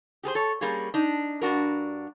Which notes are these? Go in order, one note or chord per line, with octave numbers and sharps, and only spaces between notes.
G4 G#4 A#4 C5
A4 C#5
G3 A#3 C#4 G#4
D4 D#4
G2 D4 F#4 A#4